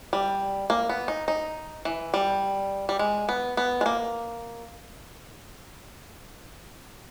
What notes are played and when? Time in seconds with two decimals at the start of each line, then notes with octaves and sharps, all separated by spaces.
0.13 G3
0.70 A#3
0.89 B3
1.08 D#4
1.28 D#4
1.85 E3
2.14 G3
2.89 G3
2.99 G#3
3.29 B3
3.57 B3
3.81 G#3
3.86 A#3